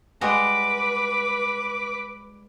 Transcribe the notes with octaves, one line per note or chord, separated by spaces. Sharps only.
G3 G#3 F#4 B4 D6